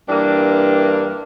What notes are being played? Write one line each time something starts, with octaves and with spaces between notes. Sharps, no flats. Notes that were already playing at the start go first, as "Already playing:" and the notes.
G2 E3 A#3 D4